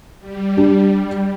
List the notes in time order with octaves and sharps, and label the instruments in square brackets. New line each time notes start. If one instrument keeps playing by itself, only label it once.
[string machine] G3
[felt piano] D4 G4